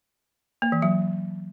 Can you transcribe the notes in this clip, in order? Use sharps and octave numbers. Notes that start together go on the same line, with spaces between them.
A#3
E3
F#3